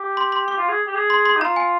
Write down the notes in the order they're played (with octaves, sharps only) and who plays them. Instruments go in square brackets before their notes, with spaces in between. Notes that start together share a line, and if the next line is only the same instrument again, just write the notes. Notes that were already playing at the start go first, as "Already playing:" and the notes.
Already playing: [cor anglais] G4
[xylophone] C6
C6
[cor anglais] G4 [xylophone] D6
[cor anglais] F4
G#4
G4
G#4
[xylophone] C6
C6
[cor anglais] D#4
[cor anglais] F4 [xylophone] A#5
[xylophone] G#5